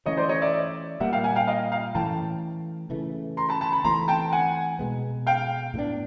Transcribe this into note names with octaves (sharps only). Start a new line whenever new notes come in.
E3 A3 C#4 C#5 D#5
C5 D5
C#5 D#5
D5 E5
A#2 G3 A#3 E5 F#5
F5 G5
F#5 G#5
F5 G5
D#5 F5
F5 G5
A2 E3 A3 C#4 G5 A5
C#3 E3 A3
A#5 C6
A5 B5
A5 B5
A5 B5
E3 A3 C4 A#5 C6
G5 A5
F#5 G#5
B2 G#3 B3
F5 G5
A2 F#3 B3 D4